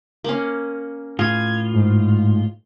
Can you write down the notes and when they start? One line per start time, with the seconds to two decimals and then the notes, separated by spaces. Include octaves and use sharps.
0.24 A#3 C#4
1.19 A2 F4 G#4 G#6
1.73 G#2